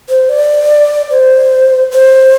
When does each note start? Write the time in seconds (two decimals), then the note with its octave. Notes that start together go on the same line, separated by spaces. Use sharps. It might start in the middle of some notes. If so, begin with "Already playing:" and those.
0.09 C5
0.29 D5
1.10 C5
1.92 C5